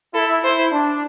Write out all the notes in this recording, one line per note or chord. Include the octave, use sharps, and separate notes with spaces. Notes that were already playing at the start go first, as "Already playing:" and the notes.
E4 A4
E4 C5
D4